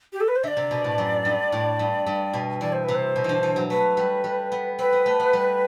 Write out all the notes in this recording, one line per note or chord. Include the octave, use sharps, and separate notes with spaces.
G4
A4
B4
C5
D3 D5 E5
C3
B2
A2
F#2
G2
A2
G2
G2
B2
E3 D5
C5
C3 B4
C5
B2
D3 E3
E3
F#3
A3 B4
G3
G3
B3
C4 B4
B3
A3
B3
G3